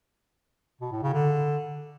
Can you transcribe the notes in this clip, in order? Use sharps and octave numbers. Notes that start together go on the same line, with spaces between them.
B2
A2
C#3
D3